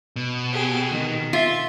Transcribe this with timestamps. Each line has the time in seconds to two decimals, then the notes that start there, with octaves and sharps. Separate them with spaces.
0.16 B2
0.52 G4 G#4
0.90 D#3
1.33 F4 E5